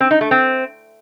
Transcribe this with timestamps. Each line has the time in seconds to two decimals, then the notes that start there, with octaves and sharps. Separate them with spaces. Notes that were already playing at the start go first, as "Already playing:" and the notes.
0.01 C4
0.11 D#4
0.21 A3
0.31 C4